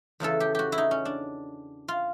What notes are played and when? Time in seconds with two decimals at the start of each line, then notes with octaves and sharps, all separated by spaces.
0.20 E2 C#3 E3 A4
0.40 G4
0.55 F#4 G4
0.72 E4
0.78 D#4
0.91 C#4
1.05 D4
1.88 F4